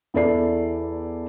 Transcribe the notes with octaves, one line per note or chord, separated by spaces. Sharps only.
E2 E4 A4 D5 C7